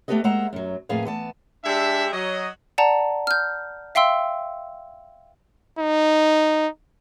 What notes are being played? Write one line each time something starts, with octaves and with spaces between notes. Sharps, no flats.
A3 B3 G4 A4 B4 D#5
G#3 A#3 C5 E5 F#5 A#5
F#2 F#3
F2 A2 A#3 G#4 B4 F5
E3 B3 A5
G#3 D4 G4 E5
F#3 D#5
D5 F#5 A5 A#5
F6 G6
E5 F5 G5 C6 E6
D#4